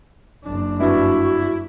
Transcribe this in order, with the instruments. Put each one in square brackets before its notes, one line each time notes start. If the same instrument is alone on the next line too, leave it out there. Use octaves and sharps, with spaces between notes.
[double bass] F#1 D4
[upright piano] G2 [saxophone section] E4 [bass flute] F#4